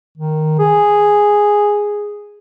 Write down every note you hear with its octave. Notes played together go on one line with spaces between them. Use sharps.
D#3
G#4